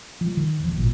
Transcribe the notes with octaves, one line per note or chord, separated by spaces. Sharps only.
F3 G3
D#3
D#1 D#2 F3
G#1 A#2